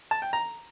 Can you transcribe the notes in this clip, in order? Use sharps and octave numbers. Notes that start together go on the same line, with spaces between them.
A5
G5
A#5